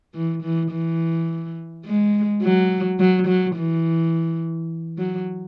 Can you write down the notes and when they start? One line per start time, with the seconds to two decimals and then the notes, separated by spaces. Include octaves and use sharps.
0.15 E3
0.43 E3
0.72 E3
1.85 G#3
2.43 F#3
2.99 F#3
3.27 F#3
3.56 E3
4.98 F#3